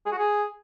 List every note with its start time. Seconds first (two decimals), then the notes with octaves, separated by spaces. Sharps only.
0.06 G#4
0.12 F#4
0.18 G#4